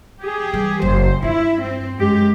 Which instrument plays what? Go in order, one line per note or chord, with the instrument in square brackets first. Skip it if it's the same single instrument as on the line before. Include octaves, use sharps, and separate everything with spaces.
[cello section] G4 G#4
[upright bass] E3 G3
[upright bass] F#1 [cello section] F#2 C5
[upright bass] G2 F4 [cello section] E4
[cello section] C4
F#2 G#3 G4